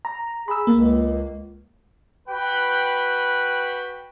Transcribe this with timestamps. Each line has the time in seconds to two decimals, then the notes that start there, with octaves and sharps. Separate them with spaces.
0.05 A#5
0.48 G#4 B5 E6
0.67 C#2 A#3
2.28 F#4 B4 G5 B5